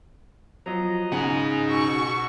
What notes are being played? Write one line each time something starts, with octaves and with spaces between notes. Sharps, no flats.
F3 F#3 D#5 A#5
C#3 D#4 G#4 F#5
B2 F#4 C#6 E6